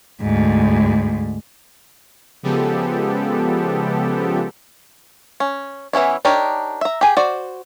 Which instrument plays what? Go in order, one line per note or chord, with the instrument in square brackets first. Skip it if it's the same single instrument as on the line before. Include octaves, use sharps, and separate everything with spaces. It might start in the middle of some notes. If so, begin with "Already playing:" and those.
[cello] D2 G#2
[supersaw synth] C#3 F3 G#3 B3 G4 A4
[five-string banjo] C#4
E3 B3 C#4 E4
D4 D#4 G4 A#4 C#5
E5 A#5
G4 G#4
F#4 C5 D5